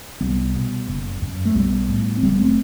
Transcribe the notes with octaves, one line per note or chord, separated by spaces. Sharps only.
C2 G3 B3
B2
F#1
F#2
A3
B1 G3 B3
A2
C4
F#1 G3 B3
A3 C4